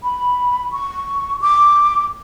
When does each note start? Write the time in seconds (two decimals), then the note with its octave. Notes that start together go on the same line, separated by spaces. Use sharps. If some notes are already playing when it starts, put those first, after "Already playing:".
0.03 B5
0.72 C#6
1.41 D6